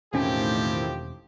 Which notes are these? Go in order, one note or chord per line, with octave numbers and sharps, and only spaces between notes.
E1 A2 D#3 F3 C4 C#4 E4 G4